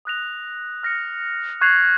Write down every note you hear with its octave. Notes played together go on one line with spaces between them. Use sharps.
D#6 F#6 A#6 F7
F6 A#6 C#7
C#6 F#6 G#6 C7 F7